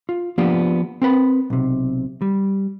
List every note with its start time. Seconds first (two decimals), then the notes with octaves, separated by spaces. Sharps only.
0.09 F4
0.38 F3 A#3 B3 D4 F4 G4
1.02 C4 A#4 B4 B5
1.50 B1 C3
2.22 G3